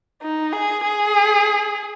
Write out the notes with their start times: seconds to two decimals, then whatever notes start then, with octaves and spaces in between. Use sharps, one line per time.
0.22 D#4
0.53 G#4
0.84 G#4